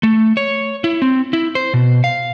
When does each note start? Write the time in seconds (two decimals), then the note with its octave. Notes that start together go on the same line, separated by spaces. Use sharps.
0.03 A3
0.37 C#5
0.84 E4
1.02 C4
1.33 E4
1.55 C5
1.74 B2
2.04 F5